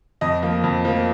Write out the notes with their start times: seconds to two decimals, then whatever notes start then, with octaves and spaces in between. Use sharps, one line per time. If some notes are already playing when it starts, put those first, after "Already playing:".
0.21 F2 D#5
0.42 F3 A#3
0.64 F2
0.85 F3 A#3